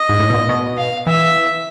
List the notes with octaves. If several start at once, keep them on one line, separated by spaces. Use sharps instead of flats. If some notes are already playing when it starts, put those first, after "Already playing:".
Already playing: D#5
G#2
A2
B2
A#2
B2
F5
E3 E5